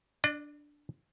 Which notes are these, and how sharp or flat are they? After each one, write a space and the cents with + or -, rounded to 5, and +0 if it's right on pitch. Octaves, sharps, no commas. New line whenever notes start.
D4 +0 D5 +45